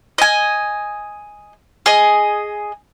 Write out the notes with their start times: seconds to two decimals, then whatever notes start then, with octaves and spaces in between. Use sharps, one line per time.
0.18 D#5 G#5
1.86 G#4 D#5